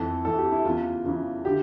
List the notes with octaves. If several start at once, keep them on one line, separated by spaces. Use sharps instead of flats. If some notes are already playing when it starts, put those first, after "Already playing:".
Already playing: F2 E3 A4
F2 E3 A4
G4
E4
E2 C#3 E3 F4
E2 C#3 E3
D3 G4